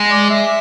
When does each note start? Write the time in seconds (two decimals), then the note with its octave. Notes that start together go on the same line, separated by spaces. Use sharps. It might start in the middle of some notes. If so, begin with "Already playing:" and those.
Already playing: G#3
0.11 D5
0.30 E5